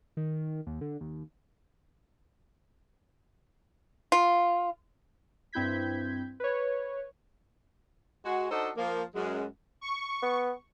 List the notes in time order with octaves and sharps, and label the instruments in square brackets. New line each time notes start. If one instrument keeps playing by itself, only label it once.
[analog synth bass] D#3
D#2
D3
D#2
[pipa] F4
[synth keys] G2 C4 E4 G6 G#6 B6
B4 C#5
[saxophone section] G#3 F#4
D4 D#4 F#4 A4 C5 D#5
F3 A#3
F#2 G#3
[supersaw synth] C#6
[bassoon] B3